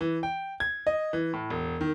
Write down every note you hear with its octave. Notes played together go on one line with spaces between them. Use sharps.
E3
G5
G#6
D#5
E3
A2
E1
D#3